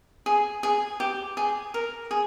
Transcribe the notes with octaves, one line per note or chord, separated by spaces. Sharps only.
G#4
G#4
G4
G#4
A#4
G#4